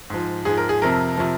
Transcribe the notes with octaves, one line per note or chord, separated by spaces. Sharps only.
G#2 F3
G#2 F3 G#4
A#4
G#4
F2 C3 F3 A#4
C3 F3